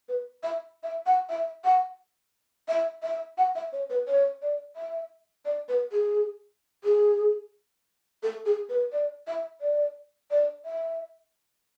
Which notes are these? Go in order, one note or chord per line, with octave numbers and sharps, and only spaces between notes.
B4
E5
E5
F#5
E5
F#5
E5
E5
F#5
E5
C#5
B4
C#5
D5
E5
D5
B4
G#4
G#4
A4
G#4
B4
D5
E5
D5
D5
E5